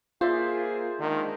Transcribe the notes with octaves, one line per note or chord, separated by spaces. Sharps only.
A#3 F4 G#4 C5 D5 E5
D#3 G#3 A#3 D4